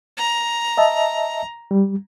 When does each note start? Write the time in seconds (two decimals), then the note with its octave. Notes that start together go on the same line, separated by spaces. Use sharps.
0.17 A#5
0.77 D#5 E5 A5
1.71 G3